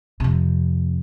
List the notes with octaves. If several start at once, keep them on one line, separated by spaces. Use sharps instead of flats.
F2 C3